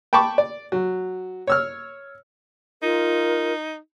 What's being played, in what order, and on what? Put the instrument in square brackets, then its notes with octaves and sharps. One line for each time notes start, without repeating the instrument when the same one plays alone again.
[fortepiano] G5 A5 B5 C#6 D6
D5
F#3
C#5 E6 F6
[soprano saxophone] D#4 [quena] F4 [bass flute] A#4